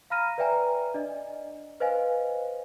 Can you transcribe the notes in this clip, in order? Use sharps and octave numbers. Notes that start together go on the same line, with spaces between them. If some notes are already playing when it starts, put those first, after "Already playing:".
F5 A#5 B5 F6 A#6 D#7
B4 D5 E5 G5 G#5 A#5
D4 D5 D#5
B4 C5 D#5 F5 G#5